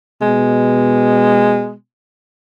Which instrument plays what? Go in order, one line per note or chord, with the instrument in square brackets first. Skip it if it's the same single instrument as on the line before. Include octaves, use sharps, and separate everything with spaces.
[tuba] B2 [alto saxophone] G#3